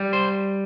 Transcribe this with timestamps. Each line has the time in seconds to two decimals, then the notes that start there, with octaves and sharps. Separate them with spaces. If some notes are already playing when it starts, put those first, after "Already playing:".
Already playing: G3
0.13 C5